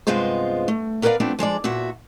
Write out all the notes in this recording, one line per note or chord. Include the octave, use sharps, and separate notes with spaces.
G2 C3 G#3 B3 F4 C5
A3
B3 A#4 B4 C#5 D5 F5
F3 A3 B3 C4 D4
F3 G#3 D4 D5
E2 A#2 F#4 E5